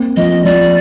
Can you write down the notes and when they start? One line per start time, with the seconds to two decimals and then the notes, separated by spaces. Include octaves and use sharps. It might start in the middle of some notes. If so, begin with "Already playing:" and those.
Already playing: A#3 C4
0.17 F3 D#5
0.45 F3 D5